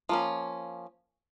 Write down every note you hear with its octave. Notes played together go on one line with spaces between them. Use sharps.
F3 A#3 C#4